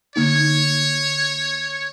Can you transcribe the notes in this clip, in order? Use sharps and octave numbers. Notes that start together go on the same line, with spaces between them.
D3 A#3 D#4 C#5